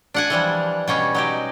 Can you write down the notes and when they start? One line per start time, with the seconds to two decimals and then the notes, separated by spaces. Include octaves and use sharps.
0.14 D4 F#5 G#5
0.30 E3 F3 G3
0.88 B2 G3 C#4
1.15 F#3 D#4 G4